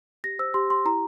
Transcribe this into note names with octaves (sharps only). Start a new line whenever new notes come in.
G4 A#6
C5 E6
G4 C6
G4 C6
E4 A#5